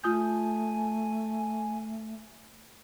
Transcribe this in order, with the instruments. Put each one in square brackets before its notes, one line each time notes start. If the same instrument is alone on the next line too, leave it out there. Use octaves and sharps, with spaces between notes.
[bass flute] A3 [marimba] F4 D#6 G6 [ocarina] G#5